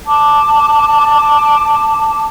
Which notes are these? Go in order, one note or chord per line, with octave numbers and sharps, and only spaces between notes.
A5 D6